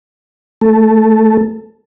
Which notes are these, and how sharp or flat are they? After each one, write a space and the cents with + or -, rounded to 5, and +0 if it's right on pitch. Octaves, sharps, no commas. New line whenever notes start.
A3 +0 A4 +0